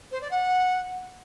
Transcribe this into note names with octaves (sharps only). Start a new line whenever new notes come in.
C5
D5
F#5